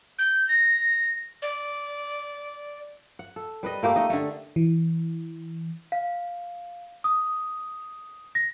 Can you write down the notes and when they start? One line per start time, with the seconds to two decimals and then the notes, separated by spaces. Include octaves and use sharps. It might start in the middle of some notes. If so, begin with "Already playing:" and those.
0.18 G6
0.48 A#6
1.42 D5
3.19 F#5
3.36 A4
3.63 G3 B4 D#5
3.83 A3 A#3 G4
3.96 A3 D#4 D#5
4.10 D3 A3
4.56 E3
5.92 F5
7.04 D#6
8.35 A#6